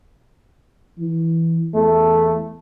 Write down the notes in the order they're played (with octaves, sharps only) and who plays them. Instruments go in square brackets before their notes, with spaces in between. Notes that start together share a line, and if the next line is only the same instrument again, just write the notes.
[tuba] E3
[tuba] E2 [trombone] A3